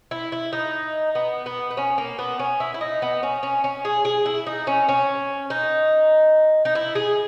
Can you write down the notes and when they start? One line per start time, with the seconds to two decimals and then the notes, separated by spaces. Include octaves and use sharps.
0.11 E4
0.32 E4
0.53 D#4
1.15 B3
1.46 B3
1.70 B3
1.77 C#4
1.98 A#3
2.19 B3
2.39 C#4
2.60 E4
2.74 E4
2.81 D#4
3.02 B3
3.23 C#4
3.43 C#4
3.64 C#4
3.85 G#4
4.05 G#4
4.26 E4
4.47 D#4
4.67 C#4
4.89 C#4
5.50 D#4
6.65 D#4
6.75 E4
6.95 G#4